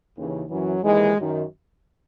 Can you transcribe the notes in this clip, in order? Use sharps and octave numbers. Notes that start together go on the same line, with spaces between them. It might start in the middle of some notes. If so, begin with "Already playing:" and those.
D#2 C#3 E3
F#2 E3 F#3
D#2 D#3 E3 G#3
F#2 D#3